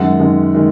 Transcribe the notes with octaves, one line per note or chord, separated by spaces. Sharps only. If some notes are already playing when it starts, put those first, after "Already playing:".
Already playing: F#2 D#3 G#3 F#5
F#2 D#3 G#3
D#3 G#3